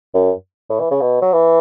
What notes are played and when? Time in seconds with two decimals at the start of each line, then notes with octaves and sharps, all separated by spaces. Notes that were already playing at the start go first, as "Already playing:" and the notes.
0.14 F#2
0.69 A2
0.80 E3
0.91 C#3
1.01 B2
1.22 F#3
1.33 E3